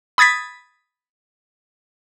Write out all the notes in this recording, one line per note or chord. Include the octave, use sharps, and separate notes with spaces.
B5 D#6 G#6 A6 B6